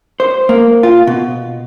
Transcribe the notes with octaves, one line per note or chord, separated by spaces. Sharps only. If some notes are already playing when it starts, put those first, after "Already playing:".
C5
A#3
F4
B2